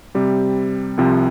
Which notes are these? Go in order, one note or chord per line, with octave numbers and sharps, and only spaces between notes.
C3 G3 C4 G4
C2 C3 F3 C4